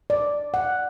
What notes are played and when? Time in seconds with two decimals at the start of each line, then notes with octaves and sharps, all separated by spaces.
0.10 D5
0.54 F#5